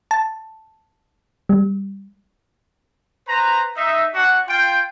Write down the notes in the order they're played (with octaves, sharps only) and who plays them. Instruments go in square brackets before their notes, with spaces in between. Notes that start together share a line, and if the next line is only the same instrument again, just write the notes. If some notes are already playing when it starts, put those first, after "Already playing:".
[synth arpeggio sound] A5
G3
[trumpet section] B4 C5 A#5
D#4 E5
D4 F#4 F#5
F4 G5